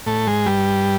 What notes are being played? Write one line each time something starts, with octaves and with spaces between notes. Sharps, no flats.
A2 A3
G#2 G#3
G2 G3